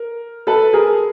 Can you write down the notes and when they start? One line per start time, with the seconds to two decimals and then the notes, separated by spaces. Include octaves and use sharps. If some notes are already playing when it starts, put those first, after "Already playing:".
Already playing: A#4
0.47 A4 B4
0.73 G#4 A#4